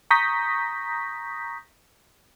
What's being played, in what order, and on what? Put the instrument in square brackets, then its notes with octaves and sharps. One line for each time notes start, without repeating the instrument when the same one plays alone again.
[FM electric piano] A#5 C#6 D#6 G6 A#6 B6